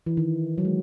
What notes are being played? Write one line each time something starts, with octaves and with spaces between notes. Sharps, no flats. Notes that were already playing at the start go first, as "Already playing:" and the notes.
E3
D#3
F#3
G#3